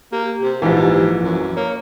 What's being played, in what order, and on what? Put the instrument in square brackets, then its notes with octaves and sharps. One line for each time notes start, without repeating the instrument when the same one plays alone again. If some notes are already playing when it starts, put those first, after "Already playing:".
[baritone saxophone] A#3 [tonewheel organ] G4
[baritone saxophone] C3
[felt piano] A#1 E3 [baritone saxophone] G#2 [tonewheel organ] G4 A5
[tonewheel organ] F3
[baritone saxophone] F#2
[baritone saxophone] A#3 [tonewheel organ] C#5